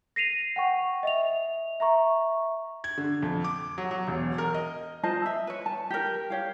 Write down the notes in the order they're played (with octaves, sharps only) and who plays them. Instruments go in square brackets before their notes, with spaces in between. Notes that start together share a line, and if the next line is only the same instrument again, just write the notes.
[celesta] A#6 C7 D#7 F7
F#5 G5 C#6
D#5 E5 F7
E5 A#5 C#6
[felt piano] G#6
D3
F2
D6
F#3
F#3
E1
A#4
D#5
[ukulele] F4 C5 D#5 A5
E5
B4 C#5
A5
G4 A#4
G4 C#5 F5